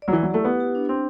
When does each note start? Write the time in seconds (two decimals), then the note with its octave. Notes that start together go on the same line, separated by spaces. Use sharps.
0.02 D5
0.08 F#3
0.13 E3 E4
0.23 F#3
0.30 A3 G4
0.45 B3 G4
0.60 G4
0.75 D4
0.89 C4 D4